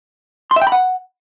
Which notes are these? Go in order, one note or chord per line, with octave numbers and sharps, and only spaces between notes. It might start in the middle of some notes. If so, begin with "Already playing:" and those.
C6
E5
G5
B5
F#5